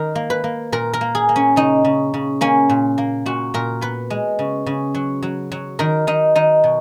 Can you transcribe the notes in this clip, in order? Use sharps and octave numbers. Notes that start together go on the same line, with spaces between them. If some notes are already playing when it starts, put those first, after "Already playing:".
Already playing: D#3 A#4
A#3
B4
A#3
A#2 A#4
A#4
A#3
G#4
A#3
C#4
C#3 D#4
C#3
C#3
A#3 C#4
A#2
A#3
A#2 F#4
A#2 A#4
B3 B4
G#3
C#3
C#3
F#3
F#3
F#3
D#3 A#4
D#3 D#4
D#3 D#4
B2